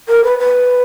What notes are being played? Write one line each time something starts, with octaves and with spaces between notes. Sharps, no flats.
A#4
B4
B4